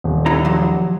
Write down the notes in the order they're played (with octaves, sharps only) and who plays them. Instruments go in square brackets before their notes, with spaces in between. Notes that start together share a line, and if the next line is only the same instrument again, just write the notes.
[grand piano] D#1
[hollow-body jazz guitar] D3 E4 A#5
F3 F#3